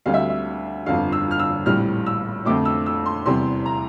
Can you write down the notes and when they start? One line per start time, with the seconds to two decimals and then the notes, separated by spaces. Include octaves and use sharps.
0.06 D2 D3 G3 C4 F5
0.14 E5
0.29 E5
0.86 G1 F2 D3 F5
1.12 E6
1.31 F6
1.39 E6
1.66 A#1 A2 G3 C4 F6
2.06 E6
2.45 F2 D3 A3 C4 D6
2.65 E6
2.86 E6
3.06 C6
3.26 E2 C3 G3 C4 C6
3.66 A#5